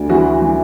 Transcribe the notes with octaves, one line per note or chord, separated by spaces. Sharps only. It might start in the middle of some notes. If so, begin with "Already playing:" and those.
Already playing: D2
E3 F#4
E3